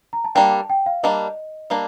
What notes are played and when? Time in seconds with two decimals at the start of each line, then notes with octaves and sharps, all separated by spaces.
0.13 A#5
0.24 A5
0.35 G3 A#3 D4 G5
0.52 A5
0.70 G5
0.86 F5
1.03 G3 A#3 D4 D#5
1.70 G3 A#3 D4